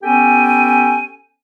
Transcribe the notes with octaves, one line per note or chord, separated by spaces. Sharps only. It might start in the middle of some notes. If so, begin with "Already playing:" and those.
B3 C#4 G4 A4 G5 G#5